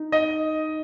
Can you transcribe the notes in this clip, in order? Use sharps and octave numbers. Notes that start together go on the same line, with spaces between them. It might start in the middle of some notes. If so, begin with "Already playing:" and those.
Already playing: D#4
D#5